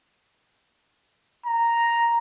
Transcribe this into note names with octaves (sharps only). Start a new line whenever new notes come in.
A#5